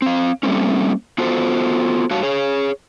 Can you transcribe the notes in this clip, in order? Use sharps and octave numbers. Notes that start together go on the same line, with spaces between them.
C4 F5
G3 A3 A#3 C4 C#4
B3 F4 F#4 A4 C5
G2 F#4 C#5 F5 A5
G#4 C#5